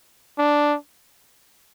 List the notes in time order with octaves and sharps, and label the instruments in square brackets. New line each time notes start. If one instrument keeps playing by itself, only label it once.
[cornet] D4